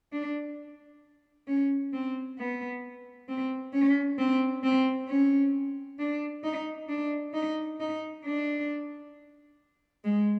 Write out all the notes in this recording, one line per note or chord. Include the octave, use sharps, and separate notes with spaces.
D4
C#4
C4
B3
C4
C#4
C4
C4
C#4
D4
D#4
D4
D#4
D#4
D4
G#3